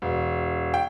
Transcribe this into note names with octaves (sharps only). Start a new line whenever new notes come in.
E1
G5